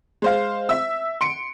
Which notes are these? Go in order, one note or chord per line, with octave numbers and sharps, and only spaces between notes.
G#3 C5 F5
E5 E6
C6 C#7 D7